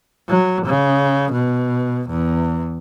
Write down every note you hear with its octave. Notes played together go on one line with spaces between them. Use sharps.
F#3
C#3
B2
E2